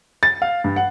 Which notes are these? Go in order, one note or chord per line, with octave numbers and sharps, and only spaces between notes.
A6
F5
G2
F#5